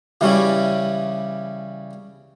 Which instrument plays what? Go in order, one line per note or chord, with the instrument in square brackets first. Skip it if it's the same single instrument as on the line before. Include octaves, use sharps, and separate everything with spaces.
[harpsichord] C#3 E3 G3 C#4 E4